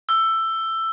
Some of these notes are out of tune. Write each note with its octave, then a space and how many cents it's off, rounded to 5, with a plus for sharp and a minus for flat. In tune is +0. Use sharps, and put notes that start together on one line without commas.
E6 +15